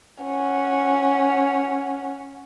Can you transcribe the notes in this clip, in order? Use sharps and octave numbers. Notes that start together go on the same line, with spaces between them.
C#4 F#5